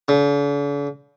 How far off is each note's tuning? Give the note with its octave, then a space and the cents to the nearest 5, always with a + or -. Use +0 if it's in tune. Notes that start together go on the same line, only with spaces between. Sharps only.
D3 -45